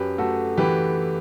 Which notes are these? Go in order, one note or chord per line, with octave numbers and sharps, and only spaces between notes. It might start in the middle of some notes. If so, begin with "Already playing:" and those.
Already playing: F#2 G4 B4
A3 F#4 A4
E3 G4 B4